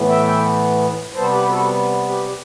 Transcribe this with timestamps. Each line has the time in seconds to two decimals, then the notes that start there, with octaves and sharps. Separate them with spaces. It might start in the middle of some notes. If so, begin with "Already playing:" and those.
Already playing: A2 E3 B3
0.09 E5 G5
0.27 E5 G5
1.14 C3 G3 B3 A4 C5
1.31 G4 B4
1.49 F#4 A4
2.07 G4 B4
2.26 G4